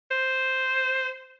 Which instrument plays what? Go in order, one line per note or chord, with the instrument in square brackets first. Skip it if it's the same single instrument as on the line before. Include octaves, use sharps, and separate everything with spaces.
[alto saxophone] C5